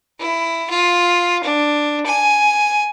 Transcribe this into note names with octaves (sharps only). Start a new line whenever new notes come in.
E4
F4
D4
G#5